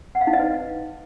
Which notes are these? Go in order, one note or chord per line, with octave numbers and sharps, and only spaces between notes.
F#5
F5
D#4
D#5
B4